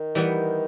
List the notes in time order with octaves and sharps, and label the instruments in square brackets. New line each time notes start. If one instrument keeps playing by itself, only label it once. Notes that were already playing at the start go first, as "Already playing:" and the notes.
Already playing: [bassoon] D#3
[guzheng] E3 G3 B3